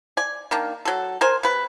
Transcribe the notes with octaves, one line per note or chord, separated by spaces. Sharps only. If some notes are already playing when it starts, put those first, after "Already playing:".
D5 G#5
D#3 A#3 D4
F#3 A4
A#4 C5 G#5
C3 B4